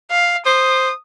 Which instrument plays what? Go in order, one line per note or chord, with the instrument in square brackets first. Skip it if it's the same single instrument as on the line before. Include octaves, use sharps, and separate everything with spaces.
[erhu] F5
[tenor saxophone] C5 [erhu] D#6